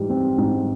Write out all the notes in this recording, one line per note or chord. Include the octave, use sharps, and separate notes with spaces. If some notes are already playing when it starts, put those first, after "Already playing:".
Already playing: G#2 E3 G3
C4
G#2